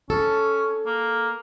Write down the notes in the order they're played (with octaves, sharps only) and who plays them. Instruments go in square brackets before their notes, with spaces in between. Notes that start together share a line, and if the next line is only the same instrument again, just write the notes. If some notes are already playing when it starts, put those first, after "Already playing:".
[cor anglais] C#4 [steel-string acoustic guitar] A4
[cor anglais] A#3